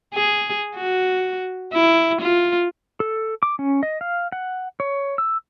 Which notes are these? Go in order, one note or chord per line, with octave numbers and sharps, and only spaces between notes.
G#4
F#4
E4
F4
A4
D6
C#4
D#5
F5
F#5
C#5
E6